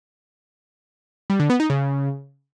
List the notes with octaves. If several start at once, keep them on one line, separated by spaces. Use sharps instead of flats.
G3
D3
B3
D#4
C#3